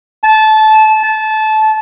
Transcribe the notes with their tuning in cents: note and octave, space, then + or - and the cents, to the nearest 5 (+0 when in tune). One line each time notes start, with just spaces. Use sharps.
A5 -20
A5 -20